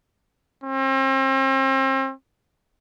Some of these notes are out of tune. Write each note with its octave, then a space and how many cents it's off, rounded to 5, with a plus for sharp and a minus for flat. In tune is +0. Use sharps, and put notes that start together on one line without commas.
C4 +40